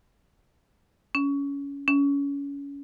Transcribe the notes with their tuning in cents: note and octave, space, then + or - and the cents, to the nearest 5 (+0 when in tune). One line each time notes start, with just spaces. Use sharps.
C#4 +20
C#4 +25